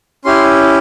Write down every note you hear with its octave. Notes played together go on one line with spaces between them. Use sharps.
C#4 E4 G4 C6